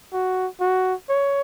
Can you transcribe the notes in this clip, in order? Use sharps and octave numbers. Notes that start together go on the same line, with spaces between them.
F#4
F#4
C#5